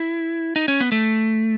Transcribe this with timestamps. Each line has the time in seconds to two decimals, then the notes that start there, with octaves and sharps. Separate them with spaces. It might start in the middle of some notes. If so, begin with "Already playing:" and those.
Already playing: E4
0.56 D#4
0.68 C#4
0.81 B3
0.92 A3